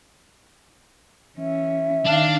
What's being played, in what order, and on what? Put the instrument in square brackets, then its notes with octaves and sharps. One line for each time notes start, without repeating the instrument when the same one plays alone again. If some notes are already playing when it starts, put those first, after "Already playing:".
[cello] E3 C#4 [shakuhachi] E5
[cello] D#3 F5 [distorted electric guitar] D4